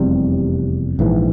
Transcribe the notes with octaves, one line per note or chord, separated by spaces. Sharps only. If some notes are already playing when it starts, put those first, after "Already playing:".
Already playing: F1 E2 C3 G3
A#1 G#2 E3